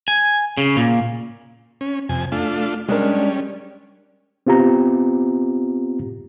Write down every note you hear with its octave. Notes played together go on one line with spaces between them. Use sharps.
G#5
C#3
A#2
C#4
F2 C3 G#5
A3 D4 F4
G3 G#3 C#4 D4 A#4
B3 C4 F4 G4 A#5